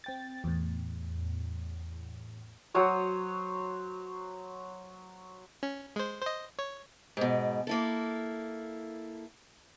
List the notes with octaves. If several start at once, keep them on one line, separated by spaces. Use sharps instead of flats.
C4 G5 A6
E2 A2
F#3 C5 C#5 D#6
C#4
G#3 C5
C5 D#5
C#5
G#2 B2
A#3 E4 A4